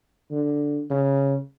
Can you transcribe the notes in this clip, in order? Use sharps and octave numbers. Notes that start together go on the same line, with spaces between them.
D3
C#3